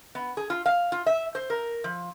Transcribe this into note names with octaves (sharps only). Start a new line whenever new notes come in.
B3
G#4
F4
F5
F4
E5
C5
A#4
F3